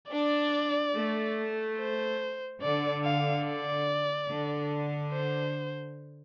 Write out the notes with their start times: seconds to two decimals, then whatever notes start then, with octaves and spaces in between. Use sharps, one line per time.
0.11 D4 D5
0.94 A3
1.78 C5
2.61 D3 D5
3.04 F5
3.45 D5
4.29 D3
5.12 C5